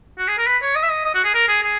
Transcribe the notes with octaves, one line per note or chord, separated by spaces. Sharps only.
F#4
G#4
A#4
B4
C#5
D#5
E5
D#5
D#5
F#4
G#4
A#4
G#4
G#4